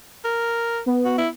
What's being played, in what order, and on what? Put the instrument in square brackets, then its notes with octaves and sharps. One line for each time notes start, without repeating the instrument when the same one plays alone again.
[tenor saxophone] A#4
[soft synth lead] B3
[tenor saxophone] F#4
E4